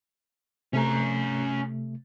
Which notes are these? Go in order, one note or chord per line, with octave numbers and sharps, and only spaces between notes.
C3 A3 C#4 A#5